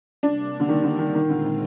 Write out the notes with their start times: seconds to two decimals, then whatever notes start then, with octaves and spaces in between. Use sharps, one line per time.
0.23 C3 G3 A#3 D4
0.60 D3
0.69 D#3
0.84 D3
0.99 D#3
1.14 A#2 D#3 G#3 C4 F4
1.30 D3
1.45 D#3